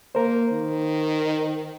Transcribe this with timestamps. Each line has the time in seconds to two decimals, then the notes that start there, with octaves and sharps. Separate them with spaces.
0.15 A#3 A#4 C5
0.52 D#3